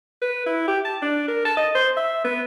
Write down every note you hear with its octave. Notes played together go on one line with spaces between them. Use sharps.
B4
E4
G4
A5
D4
A#4
A5
D#5
C5
E5
B3